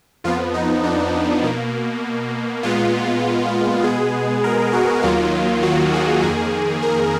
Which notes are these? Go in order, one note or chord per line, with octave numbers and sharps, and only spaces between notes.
F2 F3 B3 F4
D#4
D4
B2 A#3
A#2 G#3 B3 F4
B2 G#3 B3 G#4
A#4
F#4
D#2 D#3 F#3 A#3 F4
F#4
G#4
F2 D#3 A#3 G#4
A#4